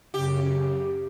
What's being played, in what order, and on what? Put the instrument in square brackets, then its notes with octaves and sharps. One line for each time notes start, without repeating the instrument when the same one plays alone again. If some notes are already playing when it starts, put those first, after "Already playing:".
[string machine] F#2 C#3 [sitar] G4